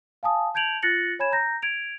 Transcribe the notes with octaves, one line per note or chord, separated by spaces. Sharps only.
F5 G#5 A5 D#6
A5 G6 G#6 D7 F7 F#7
F4 F#6 A6 A#6 C#7 F#7
C#5 G#5 B5 G#6 E7
A#5 G6 A#6
G#6 D7 F7